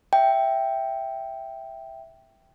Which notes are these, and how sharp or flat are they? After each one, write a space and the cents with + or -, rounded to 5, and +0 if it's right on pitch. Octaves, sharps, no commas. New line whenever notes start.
E5 +0 G5 +0